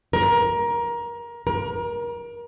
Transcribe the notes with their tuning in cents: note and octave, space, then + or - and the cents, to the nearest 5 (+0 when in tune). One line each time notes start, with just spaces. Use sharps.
A#4 +20
A#4 +30